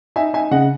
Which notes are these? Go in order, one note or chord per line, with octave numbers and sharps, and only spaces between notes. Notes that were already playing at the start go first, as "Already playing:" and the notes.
D#4 E5 G#5
D#4 E5 G#5
C#3 D#5 F#5